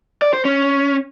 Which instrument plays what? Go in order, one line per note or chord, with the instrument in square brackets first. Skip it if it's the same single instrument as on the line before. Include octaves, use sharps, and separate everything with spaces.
[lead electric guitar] D5
C5
C#4